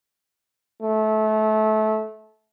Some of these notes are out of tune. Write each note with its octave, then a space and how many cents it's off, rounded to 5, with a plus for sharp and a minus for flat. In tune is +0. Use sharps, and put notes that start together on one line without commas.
A3 -25